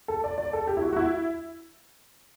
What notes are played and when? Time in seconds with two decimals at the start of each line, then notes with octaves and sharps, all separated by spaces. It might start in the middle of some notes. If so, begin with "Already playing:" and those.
0.08 A4
0.24 D5
0.38 D5
0.53 A4
0.67 G4
0.77 E4
0.82 F#4
0.93 F#4
0.96 E4